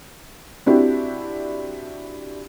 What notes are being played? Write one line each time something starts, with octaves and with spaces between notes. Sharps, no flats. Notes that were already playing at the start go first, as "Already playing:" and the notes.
C4 D4 E4 F#4 G4